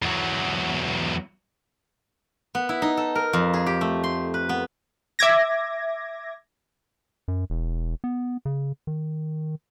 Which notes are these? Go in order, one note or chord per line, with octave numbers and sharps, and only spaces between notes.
E2 F#3
B3
E4
D#4
A4
A#4
F2
G#4
G4
A3
C6
B4
B3
E5 D6 G#6 A#6
F#2
E1
B3
C#3
D#3